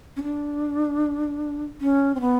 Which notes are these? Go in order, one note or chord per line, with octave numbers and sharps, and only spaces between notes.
C#4
D4
C#4
C4
B3